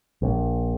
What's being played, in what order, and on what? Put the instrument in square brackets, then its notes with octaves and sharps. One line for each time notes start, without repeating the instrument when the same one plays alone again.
[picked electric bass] A#1